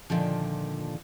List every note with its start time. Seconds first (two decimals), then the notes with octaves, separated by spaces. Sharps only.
0.10 A#2 D3 D#3 F3